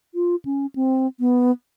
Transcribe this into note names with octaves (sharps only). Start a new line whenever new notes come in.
F4
C#4
C4
B3